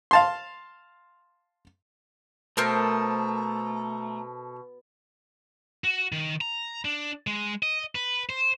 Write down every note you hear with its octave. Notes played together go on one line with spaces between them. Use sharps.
F5 A5 C6
B2 A3 A4 A#4 C5 A#5
F#4
D#3
A#5
D4
G#3
D#5
B4
C5